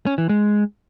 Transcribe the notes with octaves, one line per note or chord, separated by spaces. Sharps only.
C#4
E3
G#3